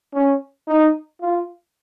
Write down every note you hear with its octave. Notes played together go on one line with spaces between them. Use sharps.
C#4
D#4
F4